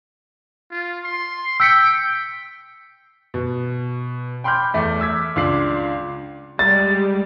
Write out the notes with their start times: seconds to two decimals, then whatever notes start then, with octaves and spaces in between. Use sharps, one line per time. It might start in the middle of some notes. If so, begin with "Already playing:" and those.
0.70 F4
1.04 C6
1.60 G5 E6 B6 C#7
3.34 B2
4.44 G5 B5 C6 D6 F6 G6
4.74 E2 A3 D6
5.00 D6 E6 G#6 B6
5.36 C#2 D4 F4 D6 C7 F#7
6.59 G3 G#3 A6